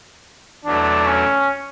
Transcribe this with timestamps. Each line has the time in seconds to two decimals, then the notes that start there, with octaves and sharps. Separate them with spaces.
0.65 E2 B2 F#3 A3 D4
1.07 C#4